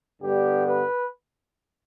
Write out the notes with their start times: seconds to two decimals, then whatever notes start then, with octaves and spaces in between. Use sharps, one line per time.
0.21 G2 D3 G3 B3 G4
0.66 B4